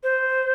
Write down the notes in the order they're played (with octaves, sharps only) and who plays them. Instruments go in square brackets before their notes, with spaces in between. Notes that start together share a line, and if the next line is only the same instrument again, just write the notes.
[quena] C5